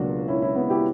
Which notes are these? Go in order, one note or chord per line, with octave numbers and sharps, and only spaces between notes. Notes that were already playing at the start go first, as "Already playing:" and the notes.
Already playing: C#2 B2 F#3 A#3 D4 F#4
C#4 E4
C#4 E4
B3
E4 G4